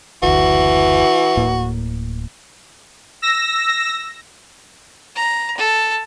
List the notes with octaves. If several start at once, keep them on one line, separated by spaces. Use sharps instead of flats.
F#1 D2 E3 F#4
D1 A2 A#3
E6 A#6
A#5
A4